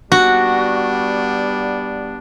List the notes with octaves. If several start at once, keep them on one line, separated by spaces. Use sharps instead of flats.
G3 B3 D4 F#4